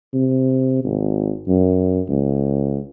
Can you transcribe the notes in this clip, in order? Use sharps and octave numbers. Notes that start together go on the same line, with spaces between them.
C3
G#1
F#2
C#2